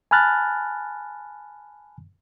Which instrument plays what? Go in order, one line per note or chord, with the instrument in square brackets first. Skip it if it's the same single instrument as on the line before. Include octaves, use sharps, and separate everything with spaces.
[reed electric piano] G#5 A5 B5 F6 F#6 A6